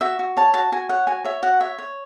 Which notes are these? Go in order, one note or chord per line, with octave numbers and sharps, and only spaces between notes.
F#4 E5
F#4
C#5 A5
F#4 A5
F#4 G#5
C#5 F#5
F#4 G#5
C#5 E5
F#4 F#5
C#5 E5
C#5